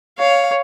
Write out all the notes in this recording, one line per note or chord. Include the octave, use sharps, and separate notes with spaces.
C#5 F5